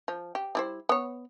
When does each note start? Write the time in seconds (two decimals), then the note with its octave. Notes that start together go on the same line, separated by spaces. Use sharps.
0.08 F3
0.35 G4
0.55 G3 E4 C5
0.89 B3 C#5